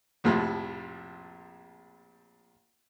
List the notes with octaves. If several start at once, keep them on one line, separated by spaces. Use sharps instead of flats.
A#1 F2 A2 C3 F3